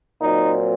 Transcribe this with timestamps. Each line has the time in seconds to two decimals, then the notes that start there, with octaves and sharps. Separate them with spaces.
0.21 A#2 F#3 C4 D#4